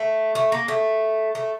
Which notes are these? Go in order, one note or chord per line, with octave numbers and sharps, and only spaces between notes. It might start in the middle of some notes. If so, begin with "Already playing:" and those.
Already playing: A3
A3
A#3
A3
A3